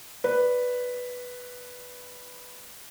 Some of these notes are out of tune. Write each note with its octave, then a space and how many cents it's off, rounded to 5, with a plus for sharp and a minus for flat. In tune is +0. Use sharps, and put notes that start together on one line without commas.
B4 +0 D5 +0